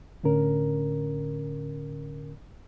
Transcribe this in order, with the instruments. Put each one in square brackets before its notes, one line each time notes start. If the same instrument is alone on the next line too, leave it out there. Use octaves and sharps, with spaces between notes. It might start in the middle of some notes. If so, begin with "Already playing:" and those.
[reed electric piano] A2 D3 C#4 A#4